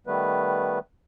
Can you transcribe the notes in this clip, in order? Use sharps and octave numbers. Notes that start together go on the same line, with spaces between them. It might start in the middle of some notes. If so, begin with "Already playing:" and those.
D#3 G3 A3 B3 B4